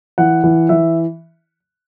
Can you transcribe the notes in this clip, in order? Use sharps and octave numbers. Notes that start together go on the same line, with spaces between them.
E3 F#5
E3
E3 E5